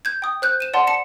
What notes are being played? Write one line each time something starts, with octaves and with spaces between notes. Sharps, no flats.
G6 G#6
G5 D#6
C5 F#6 G6
D#7 E7
D5 F#5 A5 C6
A5 C#7 E7